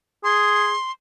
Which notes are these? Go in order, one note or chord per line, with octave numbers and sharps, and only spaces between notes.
G#4 C6